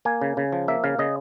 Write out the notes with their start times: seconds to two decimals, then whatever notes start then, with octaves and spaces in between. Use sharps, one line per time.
0.05 A#3 G#5
0.21 C#3
0.37 C#3
0.53 F3
0.68 A#3 E5
0.84 C#3 F5
0.99 C#3 D#5